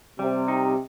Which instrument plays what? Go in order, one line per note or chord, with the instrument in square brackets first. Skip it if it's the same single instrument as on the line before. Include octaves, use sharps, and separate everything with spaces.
[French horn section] C3 [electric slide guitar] G3
[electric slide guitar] D#4